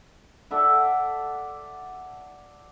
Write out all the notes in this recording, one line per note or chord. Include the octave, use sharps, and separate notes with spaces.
A4 D5 E5 F#5